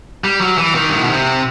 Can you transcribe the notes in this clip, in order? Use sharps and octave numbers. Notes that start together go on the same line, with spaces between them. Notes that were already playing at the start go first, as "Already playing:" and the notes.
G3
F#3
E3
D#3
G2
A2
B2
C3